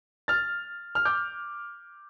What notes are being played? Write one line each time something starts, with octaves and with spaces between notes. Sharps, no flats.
F6 A6
F6
D6 G6